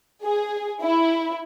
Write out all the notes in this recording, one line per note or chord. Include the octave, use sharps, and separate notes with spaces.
G#4
E4